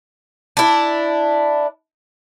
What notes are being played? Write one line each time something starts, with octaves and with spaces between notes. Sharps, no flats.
D4 E4